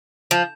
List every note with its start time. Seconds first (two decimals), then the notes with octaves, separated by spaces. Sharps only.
0.31 F3